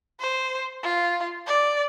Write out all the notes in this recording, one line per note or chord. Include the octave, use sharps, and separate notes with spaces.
C5
F4
D5